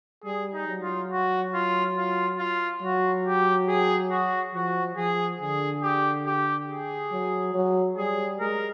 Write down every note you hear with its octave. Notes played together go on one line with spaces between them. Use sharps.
G3 G#4
D#4
F#3
F4
F#4
F4
F4
F4
F#3 F#4
G4
G#4
F#4
F3 F#4
F3 G#4
D3 G#4
G4
G4
G#4
F#3
F#3
G3 G#4
G#3 A#4